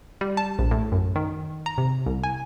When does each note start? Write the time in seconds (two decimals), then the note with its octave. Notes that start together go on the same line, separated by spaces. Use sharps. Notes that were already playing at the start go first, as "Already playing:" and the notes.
0.21 G3
0.37 A5
0.59 A#1
0.71 A2
0.92 F#2
1.16 D#3
1.66 A#5
1.78 C3
2.06 C2
2.24 G#5